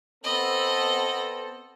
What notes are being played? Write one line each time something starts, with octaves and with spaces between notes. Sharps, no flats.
B3 C4 A4 D#5 B5